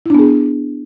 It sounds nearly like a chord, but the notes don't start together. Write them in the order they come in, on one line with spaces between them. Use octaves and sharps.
E4 D4 B3 G#4